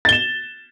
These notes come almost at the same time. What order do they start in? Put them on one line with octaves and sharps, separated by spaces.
A6 G7 E7